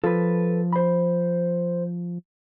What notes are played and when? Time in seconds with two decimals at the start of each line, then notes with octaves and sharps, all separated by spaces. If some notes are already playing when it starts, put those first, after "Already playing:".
0.04 F3 A4 B4
0.73 C5 B5